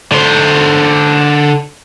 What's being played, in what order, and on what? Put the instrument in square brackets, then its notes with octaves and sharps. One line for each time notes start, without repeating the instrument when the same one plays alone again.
[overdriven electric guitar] D3 C5